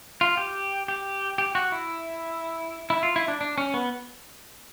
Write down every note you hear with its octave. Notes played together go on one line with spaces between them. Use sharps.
F4
G4
G4
G4
F#4
E4
E4
F4
E4
D4
D4
C#4
B3